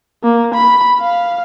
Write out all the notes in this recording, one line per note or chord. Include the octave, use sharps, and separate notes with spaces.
A#3
B5
F5